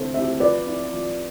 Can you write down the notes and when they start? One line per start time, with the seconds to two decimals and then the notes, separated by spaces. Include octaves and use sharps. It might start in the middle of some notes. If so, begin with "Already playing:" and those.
Already playing: D3 A3 C4 E4 A4 C5
0.14 A3 C4 E4 G4 C5 E5
0.40 F3 B4 D5
0.66 C4 E4
0.92 F3